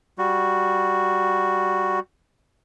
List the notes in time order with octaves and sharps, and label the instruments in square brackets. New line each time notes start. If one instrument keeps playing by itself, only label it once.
[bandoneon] G3 F#4